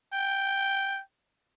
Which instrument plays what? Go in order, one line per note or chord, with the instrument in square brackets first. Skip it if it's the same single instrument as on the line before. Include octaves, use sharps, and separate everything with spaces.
[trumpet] G5